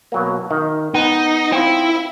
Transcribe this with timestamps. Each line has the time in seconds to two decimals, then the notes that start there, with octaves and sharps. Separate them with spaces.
0.12 B2 F#3 A#3
0.51 D#3
0.95 B3 D#4
1.52 C4 E4 F4